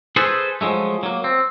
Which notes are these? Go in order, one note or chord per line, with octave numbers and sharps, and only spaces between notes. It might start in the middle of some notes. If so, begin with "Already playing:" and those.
G#4 A4 B4 C5
F3 F#3 G#3 A3
F#3 A#3
C4